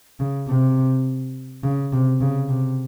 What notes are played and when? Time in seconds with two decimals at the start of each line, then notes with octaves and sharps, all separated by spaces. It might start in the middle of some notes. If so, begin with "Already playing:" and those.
0.20 C#3
0.48 C3
1.64 C#3
1.92 C3
2.21 C#3
2.49 C3